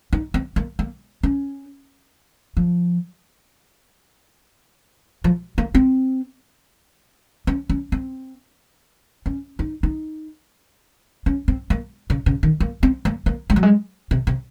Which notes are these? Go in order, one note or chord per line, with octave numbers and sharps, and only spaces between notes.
D#4
C4
A#3
A#3
C#4
F3
F3
A#3
C4
C#4
C#4
C4
C#4
D#4
D#4
C#4
C4
A#3
C#3
C#3
D#3
A#3
C4
A#3
A#3
G#3
F#3
G#3
C3
C3